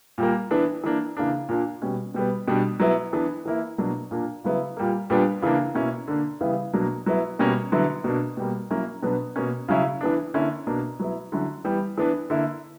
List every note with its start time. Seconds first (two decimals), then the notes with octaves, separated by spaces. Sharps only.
0.18 A#2 G3 A#3
0.51 E3 B3 D4
0.84 E3 A#3 D4
1.17 C#3 E3 A#3 D4
1.49 A#2 A#3 D4
1.82 B2 G3 C#4
2.14 B2 G3 B3
2.47 B2 G3 B3 D4
2.80 F#3 B3 E4
3.13 E3 B3 D4
3.45 E3 A#3 E4
3.78 B2 F#3 A#3 D4
4.11 A#2 A#3 D4
4.44 C#3 F#3 B3 E4
4.77 A#2 G3 A#3
5.10 A#2 G3 B3 D4
5.42 C#3 E3 A#3 D4
5.75 B2 A#3 C#4 E4
6.08 D3 A#3 D4
6.41 C#3 E3 G3 B3 E4
6.73 B2 F#3 A#3 D4
7.06 F#3 B3 E4
7.39 B2 G3 A#3 C#4
7.72 D3 F#3 B3 E4
8.04 B2 A#3 D4
8.37 B2 G3 A#3
8.71 F#3 A#3 C#4 E4
9.03 B2 F#3 B3 D4
9.36 B2 A#3 C#4
9.68 C#3 F#3 C#4 E4
10.01 E3 B3 D4
10.34 D3 A#3 C#4 E4
10.67 B2 A#3 D4
11.00 F#3 B3 E4
11.32 D3 F#3 C#4 E4
11.65 E3 G3 B3
11.98 E3 B3 D4
12.30 D3 A#3 E4